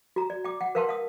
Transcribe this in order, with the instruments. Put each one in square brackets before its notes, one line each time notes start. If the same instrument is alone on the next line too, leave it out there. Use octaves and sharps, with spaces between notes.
[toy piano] F#4 A#5
D5
G5 D6
F#5 G5
A#4 B4 F5 G5 A5 C6
F5 D#6